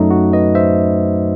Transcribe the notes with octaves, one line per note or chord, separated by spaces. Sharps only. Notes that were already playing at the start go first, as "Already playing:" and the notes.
Already playing: F#2 F#3 A3 D#4
F#4
B4 D#5
C5 E5